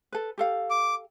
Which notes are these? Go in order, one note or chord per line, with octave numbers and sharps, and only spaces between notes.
A4 B4
G4 A4 F5
D6